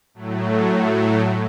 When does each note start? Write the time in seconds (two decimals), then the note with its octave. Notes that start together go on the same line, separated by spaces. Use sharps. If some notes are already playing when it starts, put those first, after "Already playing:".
0.14 A2 F#3 A3